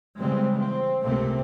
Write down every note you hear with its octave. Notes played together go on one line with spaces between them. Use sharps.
C#3 E3 G3 G#3 C4
C4
C#2 C3 A3 A#3 C4